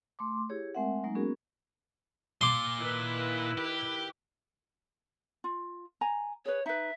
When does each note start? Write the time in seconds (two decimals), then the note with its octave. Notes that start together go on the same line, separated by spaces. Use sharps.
0.19 A3 C6 D6
0.50 E4 G4 G#4 C#5
0.75 G#3 A3 C4 A#4 E5 F#5
1.04 F#3 G#3 A#3 D#4
1.15 A#3 B3 C#4 F#4 G#4 A#4
2.41 A#2 C6 D6
2.78 D#3 E4 B4
3.58 G4
5.44 F4
6.01 G#5 A#5
6.46 G#4 B4 C#5
6.66 D#4 B4 E5